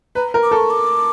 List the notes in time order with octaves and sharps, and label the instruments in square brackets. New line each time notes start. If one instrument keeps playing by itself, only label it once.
[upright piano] B4 [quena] A#5
[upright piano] A#4
[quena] D6
[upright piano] A4
[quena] C#6
D6